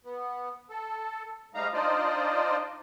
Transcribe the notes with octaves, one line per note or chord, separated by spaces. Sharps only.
B3
A4
G#2 G3 A3 D#4 F5 A#5
D4 D#4 F4 C5 D5 D#5